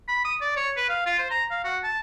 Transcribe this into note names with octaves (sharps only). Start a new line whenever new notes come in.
B5
D#6
D5
C#5
B4
F5
F4
C5
A#5
F5
F#4
A5